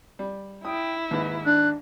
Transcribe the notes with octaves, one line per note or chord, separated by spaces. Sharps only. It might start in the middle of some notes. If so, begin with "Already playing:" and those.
G3
E4 G5 D#6
D#2 G#2 D#4 B4
D4 F#6